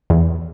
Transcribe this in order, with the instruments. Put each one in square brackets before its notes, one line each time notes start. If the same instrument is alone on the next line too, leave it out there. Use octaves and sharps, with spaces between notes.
[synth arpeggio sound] E2